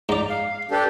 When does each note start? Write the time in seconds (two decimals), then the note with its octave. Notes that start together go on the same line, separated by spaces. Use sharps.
0.09 G#2 D5 A#5
0.28 F5
0.71 D4 G4 A4 B4